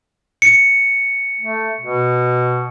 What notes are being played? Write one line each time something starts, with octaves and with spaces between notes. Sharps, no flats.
C#7
A3
B2